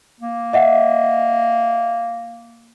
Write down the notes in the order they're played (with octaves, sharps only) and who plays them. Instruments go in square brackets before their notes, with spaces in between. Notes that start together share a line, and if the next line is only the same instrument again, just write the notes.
[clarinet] A#3
[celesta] D#5 E5 F#5